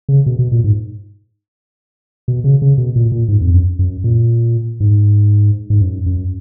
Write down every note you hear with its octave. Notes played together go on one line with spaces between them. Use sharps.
C#3
B2
B2
A#2
G#2
B2
C#3
C#3
B2
A#2
A#2
G#2
F2
F#2
F#2
A#2
G#2
G#2
F#2
F#2